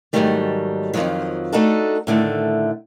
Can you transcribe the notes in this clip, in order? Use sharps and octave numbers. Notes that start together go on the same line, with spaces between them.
G#2 C3 D#3 F#3 G3 A3
F2 C3 D#3 F3 F#3
A3 D4 D#4 F#4 A4
A2 D3 D#3 A3